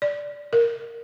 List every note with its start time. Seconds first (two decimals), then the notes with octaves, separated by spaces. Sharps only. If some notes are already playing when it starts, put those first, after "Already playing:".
0.02 D5
0.53 A#4